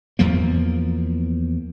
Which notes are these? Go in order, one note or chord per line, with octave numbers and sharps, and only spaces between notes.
E2 F3 A#3